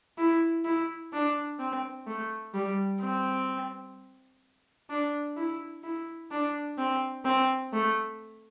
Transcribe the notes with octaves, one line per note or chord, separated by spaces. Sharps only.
E4
E4
D4
C4
A3
G3
C4
D4
E4
E4
D4
C4
C4
A3